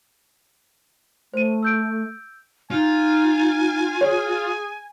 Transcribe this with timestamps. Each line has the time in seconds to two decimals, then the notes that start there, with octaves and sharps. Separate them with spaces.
1.34 A3 C5 D#7
1.63 E6 G6 D7
2.71 D#4 F4 G#5
4.01 G#4 C#5